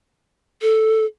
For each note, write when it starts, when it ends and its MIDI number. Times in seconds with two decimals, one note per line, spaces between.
0.62 1.05 69